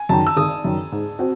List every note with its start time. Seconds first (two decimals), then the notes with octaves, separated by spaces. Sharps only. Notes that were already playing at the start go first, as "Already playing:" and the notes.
Already playing: G#5
0.09 F#2 D#3 A5
0.27 E6
0.37 G#1 D#6
0.64 F#2 D#3
0.92 G#2
1.19 C4 F#4